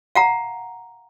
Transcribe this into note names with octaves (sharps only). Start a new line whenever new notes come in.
F5 F#5 A#5